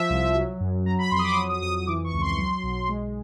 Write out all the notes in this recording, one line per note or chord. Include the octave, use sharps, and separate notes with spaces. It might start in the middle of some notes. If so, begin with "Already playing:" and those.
Already playing: F3 E5
C2
F#3
F#2
F#3 A#5
B5
F2 C6
D#6
D6
F#3 D#6
D#6
F2 D#6
D#6
E3 D6
C#6
C#2
C6
F#3 C6
B1
G#3